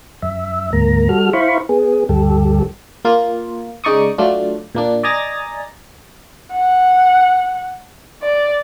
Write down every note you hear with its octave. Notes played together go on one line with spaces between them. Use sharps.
F#2 E5
D2 G#2 A#3 A#5
G3 F#4 A4 F6
E4 C5 F5 B5 C#6
B3 G#4
D2 G2 G4 A4
A#3 F4
C#3 G#3 D#4 D5 C#6 D#6
F#3 A3 D4 F4
A#2 A#3 D4
D5 D#5 G#5 A#5 A6 A#6
F#5
D5